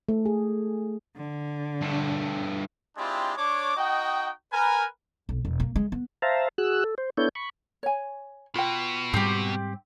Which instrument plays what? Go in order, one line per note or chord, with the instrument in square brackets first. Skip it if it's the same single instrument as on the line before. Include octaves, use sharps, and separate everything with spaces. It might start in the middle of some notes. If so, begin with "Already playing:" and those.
[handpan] A3
G#4
[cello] D3
[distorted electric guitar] G2 A3
[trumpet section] G#3 C4 D4 E4 F4 G4
D4 C#5 D6
D#4 F#4 D#5 G5
A#4 B4 G#5
[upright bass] B1
E1
A#3
G#3
B3
[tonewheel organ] C5 E5 F5 A5 A#5
F#4 G#4 E6 F#6
A4
C5
B3 D4 E4 A4 C#5 G6
B5 C#6
[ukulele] C#5 G#5
[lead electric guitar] B2 [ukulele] F4 G5
[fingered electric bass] G#2 G3 [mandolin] C4 G4